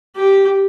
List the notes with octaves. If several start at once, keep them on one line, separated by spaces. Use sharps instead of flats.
G4